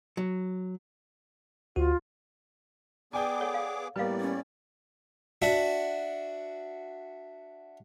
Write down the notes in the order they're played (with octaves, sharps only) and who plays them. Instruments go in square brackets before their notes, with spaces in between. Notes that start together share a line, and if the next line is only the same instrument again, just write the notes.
[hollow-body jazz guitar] F#3
[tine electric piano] D2 F#4 [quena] F4
[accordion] B3 G#4 D6 [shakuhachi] D5 [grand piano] G5 G#5
[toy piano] A4 C#5 F#5
F5
[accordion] A2 D5 [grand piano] G3 A#3 B3 [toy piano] B4 F5
[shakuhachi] C#4
[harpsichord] D4 F#4 E5